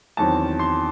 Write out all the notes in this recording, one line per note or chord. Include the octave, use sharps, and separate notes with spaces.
E2 D#3 F#3 C4 A5
C6